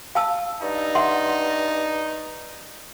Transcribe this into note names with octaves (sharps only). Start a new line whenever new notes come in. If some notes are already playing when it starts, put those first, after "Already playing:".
F5 A5 E6
G2 D#4
E5 F#5 C6